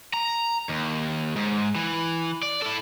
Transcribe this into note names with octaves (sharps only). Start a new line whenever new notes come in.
A#5
D#2
G#2
E3
D5
E4 A4